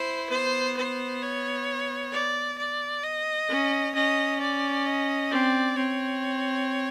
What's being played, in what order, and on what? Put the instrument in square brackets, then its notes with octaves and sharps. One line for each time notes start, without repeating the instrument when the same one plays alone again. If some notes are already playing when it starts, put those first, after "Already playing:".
Already playing: [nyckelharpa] E4 [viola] C5
[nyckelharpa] B3 [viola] C5
[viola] C5
C#5
D5
D5
D#5
[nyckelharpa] C#4
[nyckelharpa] C#4 [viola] D#5
[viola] D5
D#5
[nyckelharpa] C4 [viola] D5
[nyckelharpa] C4 [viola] C#5